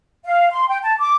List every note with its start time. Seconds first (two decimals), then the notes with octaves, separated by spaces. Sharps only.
0.25 F5
0.51 C6
0.68 G5
0.83 A5
0.98 D6